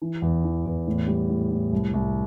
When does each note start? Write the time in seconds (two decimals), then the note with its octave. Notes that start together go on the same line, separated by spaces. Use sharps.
0.02 E3
0.22 E2
0.44 E3
0.66 E2
0.87 A2
1.07 G3
1.29 A2
1.51 A2
1.72 C2
1.94 C2